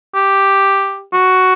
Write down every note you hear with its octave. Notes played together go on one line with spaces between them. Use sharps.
G4
F#4